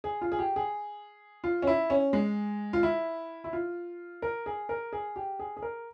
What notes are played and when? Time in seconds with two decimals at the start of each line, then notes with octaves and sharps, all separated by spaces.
0.04 G#4
0.21 F4
0.32 G#4
0.39 G4
0.56 G#4
1.44 F4
1.62 C#4
1.67 E4
1.90 C#4
2.13 G#3
2.73 F4
2.83 E4
3.44 E4
3.53 F4
4.22 A#4
4.46 G#4
4.69 A#4
4.93 G#4
5.16 G4
5.39 G#4
5.57 G#4
5.62 A#4